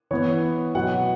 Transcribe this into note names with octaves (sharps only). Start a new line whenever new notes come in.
E3 B3 C#5
B2 F#3 B3 F#5